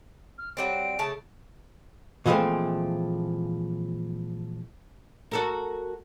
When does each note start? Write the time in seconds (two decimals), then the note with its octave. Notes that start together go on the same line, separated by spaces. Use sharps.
0.38 F6
0.57 F#3 G3 C4 D7
0.99 C#3 A3 A5
2.26 A#2 E3 F3 G#3 A3 C4
5.31 F#4 A4 A#4